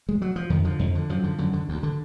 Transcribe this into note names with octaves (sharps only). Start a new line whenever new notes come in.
G#3
F#3
F3
F2 D#3
D3 F3
F2
D3
F#2 F3
D3
F#2 D3
D3
D2
D3